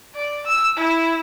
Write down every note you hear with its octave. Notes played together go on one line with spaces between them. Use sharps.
D5
E6
E4